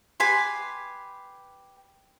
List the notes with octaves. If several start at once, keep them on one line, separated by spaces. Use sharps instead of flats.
G4 B4 G#5 C6